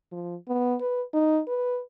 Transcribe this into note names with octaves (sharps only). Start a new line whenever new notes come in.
F3
B3
B4
D#4
B4